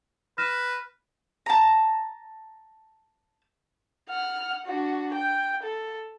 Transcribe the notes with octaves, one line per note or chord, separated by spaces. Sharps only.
B4 F6 A#6 E7
A5 A#5
F#5 F6
D4 F#4
G5
A4